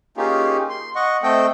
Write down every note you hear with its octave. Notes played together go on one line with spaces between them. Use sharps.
A#3 C#4 D#4 F4 G4 G#4
C6
D#5 F#5 C#6
A3 C4 A4 D#5 G5